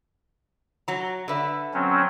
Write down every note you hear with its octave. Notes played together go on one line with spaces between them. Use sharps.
F#3 A#5
D3 B4 E5
F#3 C4 C#4